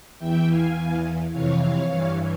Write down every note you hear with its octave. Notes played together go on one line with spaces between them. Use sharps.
E2 E3 E5 G5
F5 G#5
E2 E3
F2 C3 E3 C#5 F5
C#5 F5
G2 E3